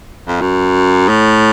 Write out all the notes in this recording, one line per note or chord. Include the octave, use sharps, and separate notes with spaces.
F2
F#2
A2